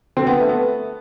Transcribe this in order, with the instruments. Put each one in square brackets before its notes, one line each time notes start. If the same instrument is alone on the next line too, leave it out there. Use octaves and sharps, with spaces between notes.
[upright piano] D3 C4
B3
A3
B3